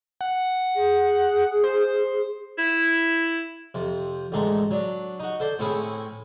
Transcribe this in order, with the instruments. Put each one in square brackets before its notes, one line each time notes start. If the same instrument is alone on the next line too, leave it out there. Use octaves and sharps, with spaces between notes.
[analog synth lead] F#5
[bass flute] G#4
[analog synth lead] C5
[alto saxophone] E4
[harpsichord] F2 C3
A1 D2 G#3 A4 A#5
F#3 D4
D#4 F#4
A4 C5 D5 C6
A2 C4 C#4 E4 G#4